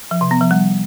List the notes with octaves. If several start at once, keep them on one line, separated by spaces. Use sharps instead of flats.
F3
C3
B3
F3
G3